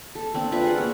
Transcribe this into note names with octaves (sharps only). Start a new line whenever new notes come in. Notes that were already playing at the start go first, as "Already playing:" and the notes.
A4
A#3 C4 D4
F4 B4 D5 E5
G#4 F#5
A#3 C#5